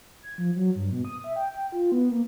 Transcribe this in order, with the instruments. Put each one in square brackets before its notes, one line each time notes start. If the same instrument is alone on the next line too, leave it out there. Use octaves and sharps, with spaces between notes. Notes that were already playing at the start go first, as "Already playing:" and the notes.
[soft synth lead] G#6
F3
F#3
G2
B2
D#6
E5
G5
G5
F4
B3
A#3